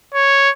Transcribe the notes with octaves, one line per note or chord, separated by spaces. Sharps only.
C#5